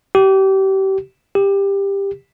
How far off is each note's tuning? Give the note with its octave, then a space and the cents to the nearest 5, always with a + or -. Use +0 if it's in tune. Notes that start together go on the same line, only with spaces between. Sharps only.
G4 -30
G4 +15